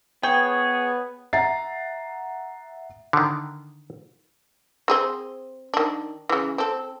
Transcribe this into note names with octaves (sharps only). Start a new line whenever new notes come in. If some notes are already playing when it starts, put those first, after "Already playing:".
B3 G#4 C#5 G5
E5 F#5 A#5 A6 C7
D3 D#3
C4 G#4 C5
D#3 D4
C#3 E3
C4 A4